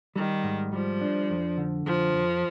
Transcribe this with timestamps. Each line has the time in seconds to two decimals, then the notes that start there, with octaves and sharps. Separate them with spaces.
0.16 D#3 G3
0.44 G#2
0.73 F3 G3
1.02 D4
1.30 F2
1.58 D3
1.86 F2 F3
2.14 F2